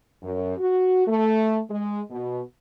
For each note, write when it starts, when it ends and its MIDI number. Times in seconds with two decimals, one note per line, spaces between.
0.23 0.56 42
0.58 1.03 66
1.08 1.60 57
1.69 2.01 56
2.11 2.41 47